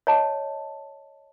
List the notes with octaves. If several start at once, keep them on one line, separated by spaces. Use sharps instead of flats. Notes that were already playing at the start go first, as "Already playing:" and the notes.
C#5 D#5 A5